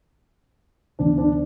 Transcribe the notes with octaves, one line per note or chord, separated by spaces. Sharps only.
D2 C3 E3 B3 D4
D4